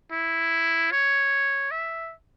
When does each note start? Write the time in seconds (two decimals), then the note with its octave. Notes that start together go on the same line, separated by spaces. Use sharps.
0.11 E4
0.91 C#5
1.71 E5